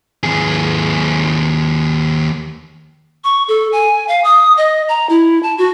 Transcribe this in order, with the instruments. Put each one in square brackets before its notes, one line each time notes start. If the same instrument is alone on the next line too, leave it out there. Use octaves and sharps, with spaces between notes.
[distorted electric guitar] D#2 G#4
[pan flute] C#6
A4
G#5
F5
D#6
D#5
A#5
E4
A5
F#4